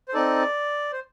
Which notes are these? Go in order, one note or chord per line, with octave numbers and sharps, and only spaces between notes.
C5
C4 D#4 A4 D5
C5